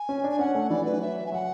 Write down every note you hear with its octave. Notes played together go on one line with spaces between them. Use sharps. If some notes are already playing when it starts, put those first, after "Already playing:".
Already playing: G#5
C#4
D4
G#5
C#4 F#5
A3
E3 D5
F#3 B4
E5
G#5
F#3 F#5